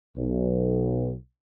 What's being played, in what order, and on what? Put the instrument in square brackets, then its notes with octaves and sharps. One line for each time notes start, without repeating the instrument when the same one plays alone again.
[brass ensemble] B1